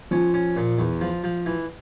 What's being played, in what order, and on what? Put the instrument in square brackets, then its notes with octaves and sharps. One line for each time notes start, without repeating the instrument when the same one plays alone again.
[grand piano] F3 [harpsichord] C#4
[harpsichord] C#4
A#2
E2
F3
F3
E3